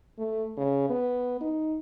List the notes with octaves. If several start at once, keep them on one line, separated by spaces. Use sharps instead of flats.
A3
C#3
B3
D#4